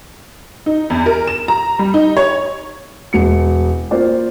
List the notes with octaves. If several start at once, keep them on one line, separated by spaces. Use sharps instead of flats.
D#4
E2
A#4
E7
A#5
G3
D#4
C#5
E1 C#7
A#3 F4 C5 D5